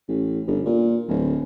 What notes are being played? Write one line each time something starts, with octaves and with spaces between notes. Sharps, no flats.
A1
G1
A#2
D1